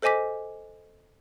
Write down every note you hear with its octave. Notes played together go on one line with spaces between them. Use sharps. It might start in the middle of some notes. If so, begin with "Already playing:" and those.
A4 C5 D#5 G#5 D6 B6